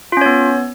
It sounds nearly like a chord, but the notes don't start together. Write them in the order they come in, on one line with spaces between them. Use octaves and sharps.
F4 C#4 C#5 B3